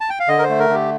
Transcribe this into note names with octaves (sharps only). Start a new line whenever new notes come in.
A5
G5
F5
D3 D#5
A#4
C5
A3
A#4
D3 G4